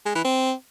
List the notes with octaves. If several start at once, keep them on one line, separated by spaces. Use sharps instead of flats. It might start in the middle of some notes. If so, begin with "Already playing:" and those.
G#3
E3
C4